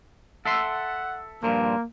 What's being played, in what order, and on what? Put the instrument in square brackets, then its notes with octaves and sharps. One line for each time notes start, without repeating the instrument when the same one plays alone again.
[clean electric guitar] A4 E5 C6 [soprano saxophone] F#5
[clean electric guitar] G2 A#2 F3 [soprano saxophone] A#3